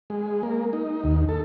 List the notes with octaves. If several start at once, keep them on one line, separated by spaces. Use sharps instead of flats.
G#3
A#3
D#4
D#2
A4